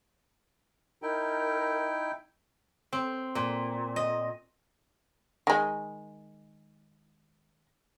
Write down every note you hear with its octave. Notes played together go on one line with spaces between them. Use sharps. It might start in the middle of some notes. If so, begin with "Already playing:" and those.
D#4 E4 A#4 G5
C4
A#2
D#5
D#3 G#3